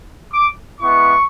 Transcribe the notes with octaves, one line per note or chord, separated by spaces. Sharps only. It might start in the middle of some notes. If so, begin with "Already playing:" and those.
D6
G#3 B3 E4 C#6